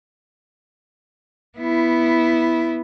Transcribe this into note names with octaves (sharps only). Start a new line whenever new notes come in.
B3 E4